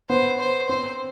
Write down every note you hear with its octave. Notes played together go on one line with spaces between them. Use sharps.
B3 C5
C5
C4 C5